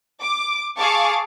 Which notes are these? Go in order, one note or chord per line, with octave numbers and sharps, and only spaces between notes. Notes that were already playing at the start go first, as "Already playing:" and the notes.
D6
G#4 F5 A5 C#6 D6